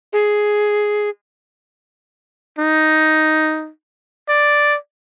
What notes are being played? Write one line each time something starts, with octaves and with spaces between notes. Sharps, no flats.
G#4
D#4
D5